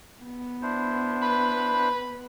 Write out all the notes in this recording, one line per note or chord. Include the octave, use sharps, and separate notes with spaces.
B3
D4 E4 C5
B4 B5